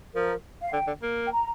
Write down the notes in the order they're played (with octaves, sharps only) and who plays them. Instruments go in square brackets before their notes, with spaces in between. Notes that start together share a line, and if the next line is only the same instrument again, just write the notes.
[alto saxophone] F3 [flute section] A#4
[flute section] F5
[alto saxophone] D3 [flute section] G5
[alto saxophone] D3
A#3
[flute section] G5
A#5